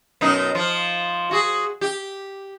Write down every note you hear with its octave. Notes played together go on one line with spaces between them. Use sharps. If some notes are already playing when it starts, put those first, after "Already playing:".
F#2 B2 D#4
F3 F4
F#4 G#4
G4